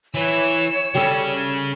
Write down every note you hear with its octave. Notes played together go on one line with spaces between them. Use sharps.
E3 B4 C#5 E6
C#3 G3 C#4 A4